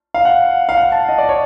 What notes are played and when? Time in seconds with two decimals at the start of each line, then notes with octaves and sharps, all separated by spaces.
0.14 F5
0.25 F#5
0.69 F5
0.77 F#5
0.92 A5
1.09 D#5
1.18 D5
1.29 C#5